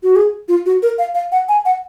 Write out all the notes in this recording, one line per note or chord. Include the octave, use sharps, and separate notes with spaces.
F#4
G#4
F4
F#4
A#4
F5
F5
F#5
G#5
F#5